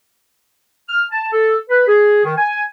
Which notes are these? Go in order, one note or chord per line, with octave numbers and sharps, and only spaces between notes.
F6
A5
A4
B4
G#4
D#3
G#5